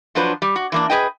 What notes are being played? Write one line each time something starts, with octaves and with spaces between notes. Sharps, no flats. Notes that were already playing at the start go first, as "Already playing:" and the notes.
F3 F#3 D4 F4 B4 C5
G3
F#4
E3 A#3 D4
G#4 B4 D#5 G5